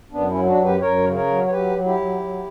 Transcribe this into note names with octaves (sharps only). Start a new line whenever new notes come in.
F#2 B3 D4
C#4 E4
F#3
D4 F#4
F#2
G4 B4
F#2 A#4 C#5
C#3
A#4 C#5
F#3
C#5
F#3 G4 B4
F#3
E4 G4
F#3
F#3